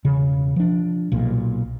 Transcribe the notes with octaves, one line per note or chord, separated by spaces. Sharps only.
E1 C#3
F3 D4
B1 A#2